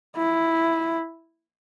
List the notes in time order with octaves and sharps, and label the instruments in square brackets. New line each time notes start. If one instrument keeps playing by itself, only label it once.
[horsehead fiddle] E4